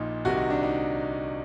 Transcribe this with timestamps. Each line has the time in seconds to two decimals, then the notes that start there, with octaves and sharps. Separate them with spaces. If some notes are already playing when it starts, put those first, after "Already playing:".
Already playing: A#1 A#2 D#4
0.25 C2 C3 D#3 F#4
0.37 D#4
0.50 D4
0.63 D#4